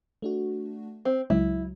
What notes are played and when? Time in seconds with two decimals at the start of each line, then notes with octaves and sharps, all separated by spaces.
0.22 A3 D4 F#4
1.05 C4
1.30 C#2 F#3 E4